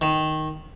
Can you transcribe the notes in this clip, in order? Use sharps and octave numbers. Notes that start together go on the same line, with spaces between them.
D#3